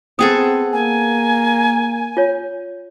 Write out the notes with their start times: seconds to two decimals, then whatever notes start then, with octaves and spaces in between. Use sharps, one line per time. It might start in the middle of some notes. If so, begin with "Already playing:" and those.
0.19 B3 C4 G#4 A4 F#5 G5 D#6
0.73 A#3 G#5
2.17 F4 C#5